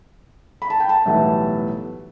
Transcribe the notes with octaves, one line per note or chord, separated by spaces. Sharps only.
B5
A5
G5
A5
B1 A2 E3 G3 B3